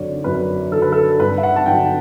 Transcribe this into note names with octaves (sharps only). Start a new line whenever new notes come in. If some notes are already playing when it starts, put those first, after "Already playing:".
Already playing: F#2 D3 F#3 C#5 D5
F#2 B4
D3 F#3 A4
B4
A4
G2 B4
E5
F#5
A5
D3 F#3 G5